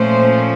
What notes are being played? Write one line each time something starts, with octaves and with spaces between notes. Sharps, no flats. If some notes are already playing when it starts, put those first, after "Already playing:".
Already playing: A#2 F3 A3 C#4 C5